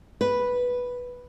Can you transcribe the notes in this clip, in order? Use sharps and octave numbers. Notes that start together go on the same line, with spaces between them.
B4